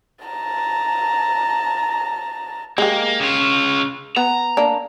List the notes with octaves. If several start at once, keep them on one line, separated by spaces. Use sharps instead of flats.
A5 A#5
G#3 A#3 G4
C#3 F4
B3 A#5
A#3 D4